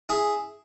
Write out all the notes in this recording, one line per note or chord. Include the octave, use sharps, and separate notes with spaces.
E4 G#4